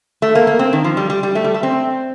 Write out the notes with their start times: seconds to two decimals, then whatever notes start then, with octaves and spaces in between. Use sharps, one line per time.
0.22 A3
0.35 A#3
0.47 A#3
0.59 C4
0.73 D#3
0.84 F3
0.97 G3
1.10 G3
1.23 G3
1.35 A3
1.44 G3
1.54 A3
1.63 C4